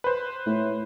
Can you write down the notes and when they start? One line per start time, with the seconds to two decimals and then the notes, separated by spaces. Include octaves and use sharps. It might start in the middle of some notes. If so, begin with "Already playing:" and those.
0.04 B4 C5
0.46 A2